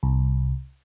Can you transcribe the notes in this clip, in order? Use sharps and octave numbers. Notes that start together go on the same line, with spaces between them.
C2